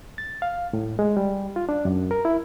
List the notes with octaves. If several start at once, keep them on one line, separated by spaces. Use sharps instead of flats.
A6
F5
A2
G#3
G3
F4
D4
F#2
A#4
E4